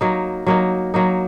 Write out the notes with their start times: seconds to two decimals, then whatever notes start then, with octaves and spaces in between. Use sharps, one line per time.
0.01 F#3 A#3 D#4
0.46 F#3 A#3 D#4
0.94 F#3 A#3 D#4